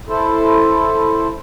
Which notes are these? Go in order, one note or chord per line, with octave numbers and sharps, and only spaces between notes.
E4 A4 C5